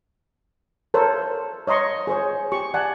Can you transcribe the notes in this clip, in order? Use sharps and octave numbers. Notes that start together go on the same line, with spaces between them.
A4 A#4 C5 C#5
C#5 D#5 A#5 C6 C#6
G#4 C5 C#5
G4 C#6
D5 F#5 G#5 A5